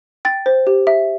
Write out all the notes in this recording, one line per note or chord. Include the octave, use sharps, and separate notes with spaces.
G5 A6
C5
G4
E5